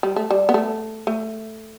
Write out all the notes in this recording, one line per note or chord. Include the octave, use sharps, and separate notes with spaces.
G3
A3
G3
B3
A3
A3